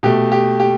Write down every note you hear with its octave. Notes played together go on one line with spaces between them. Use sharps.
B2 A3 G4
G4
G4